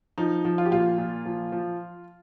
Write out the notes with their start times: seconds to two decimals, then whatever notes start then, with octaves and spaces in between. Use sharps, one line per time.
0.18 F3 D#4
0.45 F3
0.58 F4
0.65 G4
0.71 A#2 F4
0.98 A#2
1.25 F3
1.52 F3